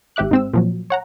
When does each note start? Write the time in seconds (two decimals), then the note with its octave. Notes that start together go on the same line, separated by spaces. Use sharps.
0.16 G#1 G4 E5 D6 F#6
0.31 G#2 C4 E6
0.54 A#2 F3 F#3
0.90 C#5 F#5 A#5